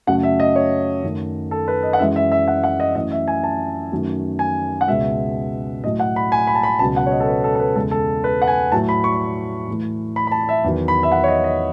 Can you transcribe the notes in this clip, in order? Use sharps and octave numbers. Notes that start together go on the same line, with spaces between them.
F#2 C#3 F#3 A3 F#5
E5
D#5
C#5
F#2 D#3 A3
A4
B4
D#5
F#5
F#2 E3 G#3 E5
E5
E5
F#5
F#5
D#5
F#2 E3 A3 D#5
E5
G#5
A5
F#2 D#3 F#3 A3
G#5
F#5
C#2 B2 G#3 E5
A2 F#3 A3 D#5
F#5
B5
G#5
B5
A5
B5
C#2 B2 F#3 A5
F#5
C#5
D#5
A4
B4
A4
A4
B4
E2 C#3 G#3 A4
A4
B4
F#5
G#5
A2 F#3 A3 A5
B5
C#6
A2 E3 A3
B5
B5
A5
E5
E2 D#3 F#3
B5
E5
F#5
C#5
D#5
D#5